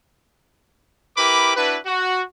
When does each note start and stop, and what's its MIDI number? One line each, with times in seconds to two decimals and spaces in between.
1.17 1.53 64
1.17 1.53 67
1.17 1.53 70
1.17 1.53 71
1.17 1.53 83
1.17 1.53 86
1.55 1.77 62
1.55 1.77 64
1.55 1.77 66
1.55 1.77 71
1.86 2.21 66